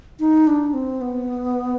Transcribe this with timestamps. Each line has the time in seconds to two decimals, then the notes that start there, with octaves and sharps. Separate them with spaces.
0.20 D#4
0.47 D4
0.74 C4
1.01 B3